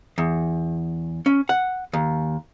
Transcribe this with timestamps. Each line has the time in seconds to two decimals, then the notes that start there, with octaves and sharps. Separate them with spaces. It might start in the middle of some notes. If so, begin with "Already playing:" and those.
0.18 E2
1.26 C#4
1.49 F#5
1.93 D#2